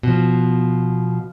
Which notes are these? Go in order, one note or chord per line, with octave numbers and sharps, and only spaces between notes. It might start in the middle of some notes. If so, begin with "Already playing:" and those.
B2 F3